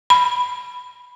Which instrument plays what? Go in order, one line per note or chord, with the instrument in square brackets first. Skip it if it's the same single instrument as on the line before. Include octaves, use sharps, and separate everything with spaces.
[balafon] B5